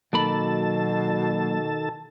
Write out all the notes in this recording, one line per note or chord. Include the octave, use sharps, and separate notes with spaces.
B2 D#3 F#3 A#3 A4 A5 B5